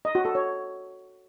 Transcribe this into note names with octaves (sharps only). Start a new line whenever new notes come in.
D#5
F#4
A4
C#5